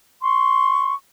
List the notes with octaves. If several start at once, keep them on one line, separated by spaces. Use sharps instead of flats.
C6 C#6